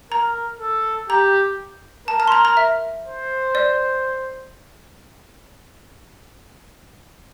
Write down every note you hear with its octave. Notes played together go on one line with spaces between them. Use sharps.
A#4 A#5
A4
G4 A#5
A#4 A5
A5
C6
A#5
A#5
E5
C5
D5